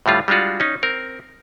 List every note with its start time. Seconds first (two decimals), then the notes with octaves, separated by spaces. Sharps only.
0.06 A2 D3 G3 F4
0.28 G3 G#3 D4 F4 F#4
0.60 C#4 D#4
0.83 C4 A#4